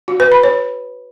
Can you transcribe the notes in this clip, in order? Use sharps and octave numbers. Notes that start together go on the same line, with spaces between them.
F#4
B4
B5
C#5